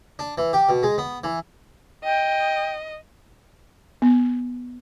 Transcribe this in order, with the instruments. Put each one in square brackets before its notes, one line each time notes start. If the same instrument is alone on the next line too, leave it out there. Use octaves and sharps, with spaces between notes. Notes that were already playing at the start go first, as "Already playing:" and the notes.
[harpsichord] D4
E3
G4
B2
G#3
B3
E3
[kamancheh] D#5 [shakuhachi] G5
[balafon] B3